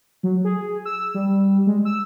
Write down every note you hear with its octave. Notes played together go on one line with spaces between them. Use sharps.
F#3
G#4
E6
G3
G#3
E6